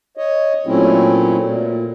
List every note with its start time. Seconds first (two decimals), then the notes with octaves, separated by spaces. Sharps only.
0.17 C#5 D#5
0.67 A#2 F#3 A3 C4 C#4 E4
1.44 A#2